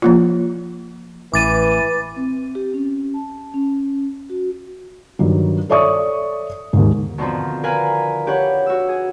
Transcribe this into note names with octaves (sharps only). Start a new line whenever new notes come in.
F3 A#3 F4
A1 E3 B4 D6 A6 D#7
C4
G4
C#4
A5
C#4
F#4
G2 D#3 F#3
A4 C#5 D5 E5 C#6 D#6
D#2 G#2
B2 D3 D#3 F3 C4
A#4 B4 F5 G#5 A#5 B5
D4 G4 B4 C#5 F#5
F#4 E6
G#4